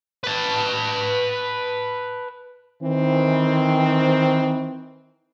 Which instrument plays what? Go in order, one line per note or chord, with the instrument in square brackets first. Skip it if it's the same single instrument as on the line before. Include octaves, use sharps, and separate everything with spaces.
[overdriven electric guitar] B4 A5
[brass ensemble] D#3 E3 C4